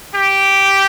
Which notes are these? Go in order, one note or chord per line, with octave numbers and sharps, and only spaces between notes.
G4